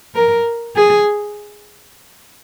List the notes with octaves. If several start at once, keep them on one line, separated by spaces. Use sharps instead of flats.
A#4
G#4